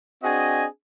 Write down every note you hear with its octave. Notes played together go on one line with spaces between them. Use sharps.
C4 D4 F#4 G#4 D#5 G#5